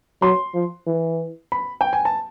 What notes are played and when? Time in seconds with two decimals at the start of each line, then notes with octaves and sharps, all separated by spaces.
0.22 F#3 C6
0.54 F3
0.87 E3
1.52 B5
1.81 G5
1.93 G#5
2.05 A5